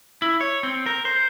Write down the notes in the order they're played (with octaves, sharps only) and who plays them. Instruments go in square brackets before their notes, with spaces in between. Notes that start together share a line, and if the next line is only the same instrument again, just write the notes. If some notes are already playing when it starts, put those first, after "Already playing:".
[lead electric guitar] E4
C#5
C4
A#4
C5